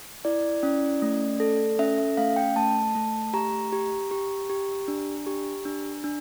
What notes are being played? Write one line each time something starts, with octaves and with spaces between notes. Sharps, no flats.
E4 D5
C#4
A3
A4
C#4 E5
E5
A3 F5
G5
A3 A5
A3
G4 A#5
G4
G4
G4
D4
G4
D4
D4